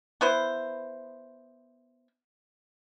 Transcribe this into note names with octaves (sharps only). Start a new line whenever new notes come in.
B3 E4 C5